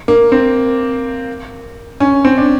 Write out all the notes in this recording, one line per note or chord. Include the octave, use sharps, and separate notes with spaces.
A#3
C4
C#4
C4
D4